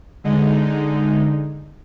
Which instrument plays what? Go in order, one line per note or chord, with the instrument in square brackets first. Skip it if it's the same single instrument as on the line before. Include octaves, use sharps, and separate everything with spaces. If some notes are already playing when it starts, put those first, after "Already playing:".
[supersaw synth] D3 G#3 D#4